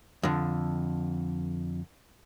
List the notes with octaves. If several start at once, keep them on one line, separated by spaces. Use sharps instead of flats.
F2 D3